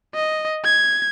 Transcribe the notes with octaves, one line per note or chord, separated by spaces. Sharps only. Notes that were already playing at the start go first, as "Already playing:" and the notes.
D#5
G#6